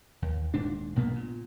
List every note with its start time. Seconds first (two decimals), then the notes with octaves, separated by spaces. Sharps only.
0.22 D#2
0.54 D#1 G#2 D4
0.96 B1 A#2 A#3 B3
1.16 A#2